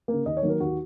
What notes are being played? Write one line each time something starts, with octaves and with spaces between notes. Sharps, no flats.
C#3 A#3
D#2 D#5
C#5
D#3 F#3 A#3
A#4
D#2 F#4